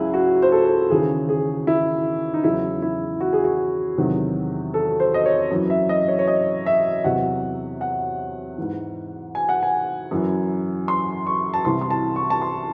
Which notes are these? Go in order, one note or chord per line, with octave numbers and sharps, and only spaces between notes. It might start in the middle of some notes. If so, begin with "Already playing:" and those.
Already playing: C#2 C#3 F#3 E4 G#4
F#4
C5
A4
D#2 C#3 E3 G#4
G#4
E4
D#4
E2 C#3 F#3 E4
E4
F#4
G#4
F#4
E2 C3 D#3 F#3
A4
C5
D#5
C#5
F#2 E3
E5
D#5
C#5
C#5
D#5
E5
E2 C3 F#3 F#5
F#5
G#2 E3
G#5
F#5
G#5
F#2 E3
C6
C#6
A5
C2 C3 E3 C6
C6
A5
C#6
A5
C6